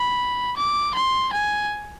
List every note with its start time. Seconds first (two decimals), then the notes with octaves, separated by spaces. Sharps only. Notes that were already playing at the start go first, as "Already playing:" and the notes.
Already playing: B5
0.57 D6
0.95 C6
1.33 G#5